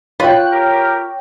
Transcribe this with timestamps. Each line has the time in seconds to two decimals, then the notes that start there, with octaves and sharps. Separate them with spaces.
0.20 F4 C#5 G5 B5 F#6
0.51 G4 A#4